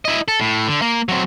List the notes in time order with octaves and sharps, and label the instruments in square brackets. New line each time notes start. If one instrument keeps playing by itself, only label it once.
[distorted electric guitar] E4 D#5
A4
A2
D3
A#3
F#3 C4